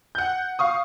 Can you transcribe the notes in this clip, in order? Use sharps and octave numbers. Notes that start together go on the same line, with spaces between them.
F#5 G6
F5 C#6 D#6